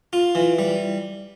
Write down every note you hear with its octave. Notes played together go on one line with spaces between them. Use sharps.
F4
E3
G3